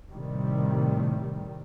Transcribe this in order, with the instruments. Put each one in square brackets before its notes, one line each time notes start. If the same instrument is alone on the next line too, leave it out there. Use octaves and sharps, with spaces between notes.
[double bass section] A2 C3 D#3 G3